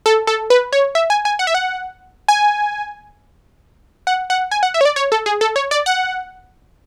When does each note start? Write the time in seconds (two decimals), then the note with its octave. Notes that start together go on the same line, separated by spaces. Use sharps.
0.06 A4
0.27 A4
0.50 B4
0.73 C#5
0.95 E5
1.10 G#5
1.25 G#5
1.39 F#5
1.47 E5
1.54 F#5
2.28 G#5
4.07 F#5
4.30 F#5
4.51 G#5
4.63 F#5
4.74 E5
4.81 C#5
4.85 D5
4.96 C#5
5.12 A4
5.26 G#4
5.41 A4
5.56 C#5
5.71 D5
5.86 F#5